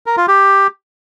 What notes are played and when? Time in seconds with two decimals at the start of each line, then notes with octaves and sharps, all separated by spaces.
0.06 A#4
0.17 F4
0.28 G4